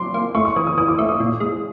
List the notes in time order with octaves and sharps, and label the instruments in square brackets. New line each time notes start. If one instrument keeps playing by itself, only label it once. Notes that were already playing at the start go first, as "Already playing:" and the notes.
Already playing: [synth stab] F#3 [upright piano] C6 D6
[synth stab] A#3
[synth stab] A3 [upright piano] C#6
[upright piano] C#6
[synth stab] E3 [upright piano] D#6
[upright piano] D#6
[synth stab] E3 [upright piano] D#6
[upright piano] D6
[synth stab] A3 [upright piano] E6
[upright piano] D#6
[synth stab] A#2
[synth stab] G#3 [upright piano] D#6